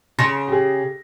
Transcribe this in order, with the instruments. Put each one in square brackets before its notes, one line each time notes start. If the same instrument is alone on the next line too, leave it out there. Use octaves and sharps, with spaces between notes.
[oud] C#3 [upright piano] C6 A#6
[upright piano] G4 G#4